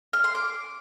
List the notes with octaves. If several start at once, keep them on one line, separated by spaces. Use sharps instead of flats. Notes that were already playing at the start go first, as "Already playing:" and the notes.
F6
C6
D6